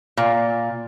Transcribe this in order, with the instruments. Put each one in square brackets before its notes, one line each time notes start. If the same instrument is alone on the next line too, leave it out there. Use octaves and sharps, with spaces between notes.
[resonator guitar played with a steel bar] A#2